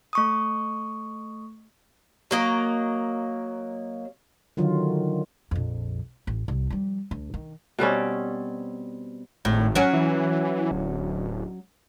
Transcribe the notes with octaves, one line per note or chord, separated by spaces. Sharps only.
A3 C#6 D#6
F#3 A#3 D#5
D3 D#3 F#3 F4
A#1 F2
A1
C2
F3 G3
D2
D#3
B2 G3 C4 C#4
G#1 A2
F#3 C#4 F#4
E3
D1